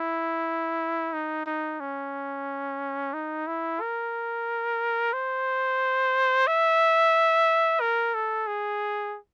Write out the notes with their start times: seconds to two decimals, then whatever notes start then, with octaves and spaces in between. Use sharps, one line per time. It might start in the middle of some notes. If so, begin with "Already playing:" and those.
Already playing: E4
1.13 D#4
1.46 D#4
1.80 C#4
3.13 D#4
3.47 E4
3.81 A#4
5.13 C5
6.47 E5
7.81 A#4
8.14 A4
8.47 G#4